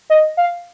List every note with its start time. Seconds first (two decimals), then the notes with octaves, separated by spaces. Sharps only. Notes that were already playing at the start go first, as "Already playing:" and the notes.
0.10 D#5
0.37 F5